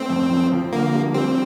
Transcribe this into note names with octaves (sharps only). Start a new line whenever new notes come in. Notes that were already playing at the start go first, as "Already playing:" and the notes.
Already playing: A3 C4
F2
F3
F3
D3 A#3
G3
G3 C4